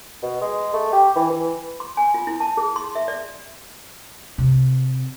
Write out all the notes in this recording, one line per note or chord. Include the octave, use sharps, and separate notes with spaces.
B2
G#3
A3
G4
E3
E3
C6
G#5
F4
E4
A5
G#4
C6
E5
D5
C3